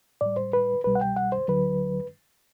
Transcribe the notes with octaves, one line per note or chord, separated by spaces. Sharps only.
A2 G3 D5
C5
B4
C2 B2 G3 B4
F#5
G5
F#5
C5
D2 D3 F#3 B4